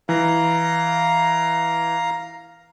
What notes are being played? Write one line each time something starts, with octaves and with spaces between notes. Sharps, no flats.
E3 F5 A#5